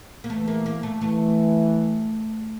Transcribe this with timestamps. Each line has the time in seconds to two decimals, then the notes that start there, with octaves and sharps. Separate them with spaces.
0.24 A#3
0.30 E3 A3
0.48 A#3
0.66 A#3
0.83 A3
1.01 E3 A3